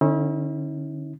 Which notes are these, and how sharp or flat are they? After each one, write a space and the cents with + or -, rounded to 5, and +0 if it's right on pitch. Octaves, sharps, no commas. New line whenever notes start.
D3 +25 C#4 -25 E4 -45